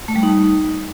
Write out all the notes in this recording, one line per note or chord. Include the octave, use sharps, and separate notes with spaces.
A3
G3
D#4